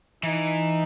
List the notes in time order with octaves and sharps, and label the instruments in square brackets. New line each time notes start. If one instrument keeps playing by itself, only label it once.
[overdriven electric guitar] E3 [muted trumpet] D#4